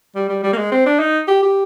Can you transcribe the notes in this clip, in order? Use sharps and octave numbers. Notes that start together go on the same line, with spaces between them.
G3
G3
G3
A#3
G#3
C4
D4
D#4
G4
G4